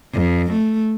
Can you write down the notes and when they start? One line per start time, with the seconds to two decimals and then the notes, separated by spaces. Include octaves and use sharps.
0.14 F2
0.53 A3